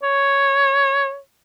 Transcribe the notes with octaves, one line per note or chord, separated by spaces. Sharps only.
C#5